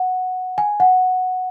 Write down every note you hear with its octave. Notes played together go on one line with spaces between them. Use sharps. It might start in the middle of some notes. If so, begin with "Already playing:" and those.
Already playing: F#5
G#5
F#5